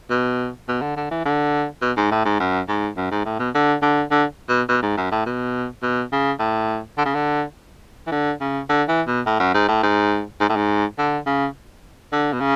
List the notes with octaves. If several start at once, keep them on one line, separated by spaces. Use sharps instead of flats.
B2
B2
D3
D3
E3
D3
B2
G#2
A2
G#2
F#2
G#2
F#2
G#2
A2
B2
D3
D3
D3
B2
B2
G#2
F#2
A2
B2
B2
C#3
A2
D3
C#3
D3
E3
D3
C#3
D3
E3
B2
A2
F#2
G#2
A2
G#2
G#2
A2
G#2
D3
C#3
D3
B2
C#3